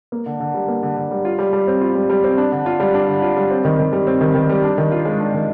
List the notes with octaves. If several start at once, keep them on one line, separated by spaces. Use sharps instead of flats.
A#3
D3
D3
G3
A#3
D3
D3
G3
F4
G3
G3
C4
F4
G3
G3
C4
D4
D3
F4
G3
D4
D3
F4
G3
C4
D#3
D#3
G3
C4
D#3
D#3
G3
D4
D#3
F4
G#3
D4
D#3